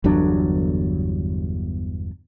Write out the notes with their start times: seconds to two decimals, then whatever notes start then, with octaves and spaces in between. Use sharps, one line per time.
0.04 G1 E2 F#3 D4